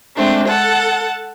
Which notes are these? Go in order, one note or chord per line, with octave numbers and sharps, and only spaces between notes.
G#3 A3 C4 D4
A4 F#5 A5